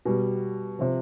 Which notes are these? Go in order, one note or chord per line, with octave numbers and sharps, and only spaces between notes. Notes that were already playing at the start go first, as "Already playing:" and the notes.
B2 G3
C3 F3